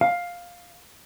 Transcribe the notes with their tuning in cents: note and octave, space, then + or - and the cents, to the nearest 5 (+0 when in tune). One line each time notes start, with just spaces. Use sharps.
F5 +10